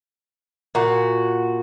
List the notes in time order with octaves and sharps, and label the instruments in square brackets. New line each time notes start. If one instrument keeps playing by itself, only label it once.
[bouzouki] A#2 F#4